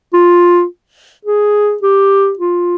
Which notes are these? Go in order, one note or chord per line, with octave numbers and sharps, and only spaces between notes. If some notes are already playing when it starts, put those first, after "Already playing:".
F4
G#4
G4
F4